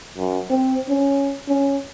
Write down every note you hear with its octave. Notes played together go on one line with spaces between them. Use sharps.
F#2
C4
C#4
C#4